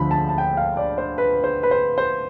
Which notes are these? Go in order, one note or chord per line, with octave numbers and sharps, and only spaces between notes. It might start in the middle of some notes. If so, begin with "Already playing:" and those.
Already playing: D2 D3 F3 B5
A5
A5
G5
F5
D5
C5
B4
C5
B4
C5
C5